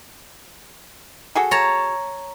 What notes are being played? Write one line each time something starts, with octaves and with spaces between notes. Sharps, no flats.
F#4 G#4 A4
C#5 A5 A#5